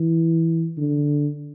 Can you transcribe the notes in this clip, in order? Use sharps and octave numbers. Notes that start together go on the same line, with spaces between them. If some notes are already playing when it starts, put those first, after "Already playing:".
Already playing: E3
D3